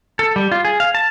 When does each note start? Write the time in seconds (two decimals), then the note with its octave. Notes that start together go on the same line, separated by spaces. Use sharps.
0.19 A4
0.36 G3
0.51 F4
0.65 G#4
0.80 F5
0.95 A5